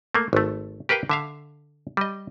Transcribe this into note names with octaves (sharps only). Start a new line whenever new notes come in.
A3 A#3
G#1 A3
G4 A#4 B4 F5 G5
D3 E5 F5
G3 D#5